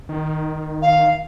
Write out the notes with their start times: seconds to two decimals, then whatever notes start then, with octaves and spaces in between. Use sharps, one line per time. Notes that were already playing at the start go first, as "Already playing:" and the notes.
0.09 D#3
0.82 F5